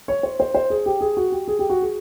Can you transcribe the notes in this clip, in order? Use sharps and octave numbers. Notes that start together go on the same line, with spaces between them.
C#5
C5
C5
C5
G#4
G4
G#4
F#4
G4
G#4
G4
F#4
G#4